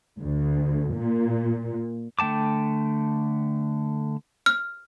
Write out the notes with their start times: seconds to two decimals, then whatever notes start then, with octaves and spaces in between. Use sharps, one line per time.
0.19 D2
0.95 A#2
2.19 D3 A3 G5 A5 D6
4.46 F6